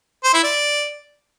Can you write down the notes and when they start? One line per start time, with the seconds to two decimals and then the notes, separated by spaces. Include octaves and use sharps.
0.24 C5
0.34 E4
0.44 D5